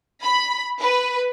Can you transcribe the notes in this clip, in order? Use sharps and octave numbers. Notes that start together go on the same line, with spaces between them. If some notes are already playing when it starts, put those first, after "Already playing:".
B5
B4